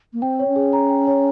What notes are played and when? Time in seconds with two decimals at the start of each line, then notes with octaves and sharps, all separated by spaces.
0.13 A#3
0.22 C4 G5
0.39 C#5
0.48 C#4
0.56 G#4
0.73 A#5
0.90 G5
1.07 C#5